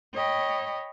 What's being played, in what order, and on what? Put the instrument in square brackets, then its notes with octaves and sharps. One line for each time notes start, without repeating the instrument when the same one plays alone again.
[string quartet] C#5 D#5 G5 B5